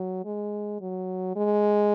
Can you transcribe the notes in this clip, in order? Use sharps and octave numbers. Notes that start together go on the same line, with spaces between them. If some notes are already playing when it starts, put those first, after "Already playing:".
Already playing: F#3
G#3
F#3
G#3